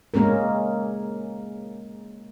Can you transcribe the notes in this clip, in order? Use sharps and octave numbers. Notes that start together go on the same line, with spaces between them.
G#3 A#3 C#4 G#4 A#4